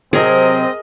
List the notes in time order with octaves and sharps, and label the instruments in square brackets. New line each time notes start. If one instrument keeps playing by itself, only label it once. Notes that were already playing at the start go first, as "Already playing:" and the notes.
[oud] C3 F#3 [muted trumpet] C4 [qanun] G#4 A#4 [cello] D#5